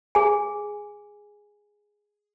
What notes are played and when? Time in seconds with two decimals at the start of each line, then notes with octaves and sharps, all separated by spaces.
0.15 G#4 G#5